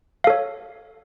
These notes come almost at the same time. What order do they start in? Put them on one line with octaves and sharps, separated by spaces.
F5 A4 C#5